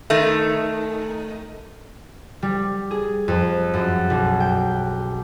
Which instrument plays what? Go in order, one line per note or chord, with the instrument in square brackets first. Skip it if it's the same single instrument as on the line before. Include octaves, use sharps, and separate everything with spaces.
[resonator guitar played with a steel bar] D#3 A3
[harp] G3
G#4
F2
F#2
B1
G5